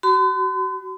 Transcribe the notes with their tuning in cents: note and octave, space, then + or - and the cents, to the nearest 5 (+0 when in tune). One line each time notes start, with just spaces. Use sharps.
F#4 +30 C6 -45